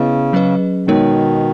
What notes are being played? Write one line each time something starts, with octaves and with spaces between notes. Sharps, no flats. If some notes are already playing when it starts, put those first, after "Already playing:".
Already playing: C#3 B3 E4 B4 D#5
F#3 C#4 G#4 B4 D#5
B2 D#3 G#3 B3 D#4 A#4 C#5